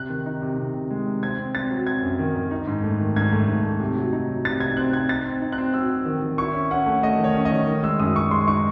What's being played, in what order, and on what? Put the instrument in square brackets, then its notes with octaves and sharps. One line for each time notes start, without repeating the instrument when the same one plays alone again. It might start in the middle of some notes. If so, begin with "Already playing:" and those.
Already playing: [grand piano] C3 F#6
D#3
D#4
C3
C3
C3
G#3
C3
C4 G#6
C4
C4 A6
F#3
C4 G#6
F#2
D#3
D#3
D#4
G#2
A3
D#3
G#2 G#6
A3
G#2
A3
C3
F#3
D#4
F#3
C3 A6
D#4 G#6
C4 F#6
C4 G#6
D#4 A6
C4
D#4
F#6
C4
F#3 E6
C4
D#3
D#3
E4 C#6
C#4
C#4 F#5
A3
A3 D#5
D#3
C#5
C#4
D#5
D#3
D#3
G#3 E6
F#2 D#6
F#2 C#6
G#3 C6
D#4 C#6